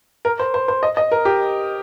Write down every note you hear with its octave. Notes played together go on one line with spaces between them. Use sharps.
A#4
C5
C5
C5
D#5
D#5
A#4
G4